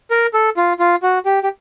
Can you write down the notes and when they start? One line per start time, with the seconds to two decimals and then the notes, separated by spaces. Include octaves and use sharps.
0.11 A#4
0.34 A4
0.57 F4
0.79 F4
1.03 F#4
1.26 G4
1.43 G4